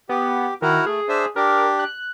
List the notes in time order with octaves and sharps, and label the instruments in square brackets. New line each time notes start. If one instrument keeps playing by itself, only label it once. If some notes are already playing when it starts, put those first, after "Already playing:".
[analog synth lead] B3 [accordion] G4
[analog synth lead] D#3 [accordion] E4 F#4 A#4
[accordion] A3 [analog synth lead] G#4
[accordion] D4 C5 E5
[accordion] D4 G4 [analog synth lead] A#4
[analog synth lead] F#6